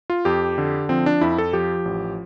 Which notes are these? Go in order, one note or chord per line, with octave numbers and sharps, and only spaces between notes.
F4
F2 G4
D3
F3 C4
D4
F2 E4
A4
F3 G4
A1